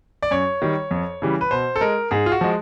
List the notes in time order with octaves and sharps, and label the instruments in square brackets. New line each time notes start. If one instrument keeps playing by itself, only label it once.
[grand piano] D5
F#2 C#5
D#3 G3
F2
C#3 E3 G3
B4
B2 C5
A4
G#3 A#4
G#2 G#4
F4
F#4
F3 G#3